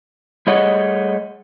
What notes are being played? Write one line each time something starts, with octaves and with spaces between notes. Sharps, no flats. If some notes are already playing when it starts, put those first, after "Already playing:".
G3 A3 G#4 C#5 D#5 F#5